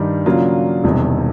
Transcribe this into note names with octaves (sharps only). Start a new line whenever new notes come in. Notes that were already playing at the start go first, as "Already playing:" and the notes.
Already playing: G2 D#3 G3
C#3 F#3 A#3 D4 F4
E1 E2 C3 D#3 G3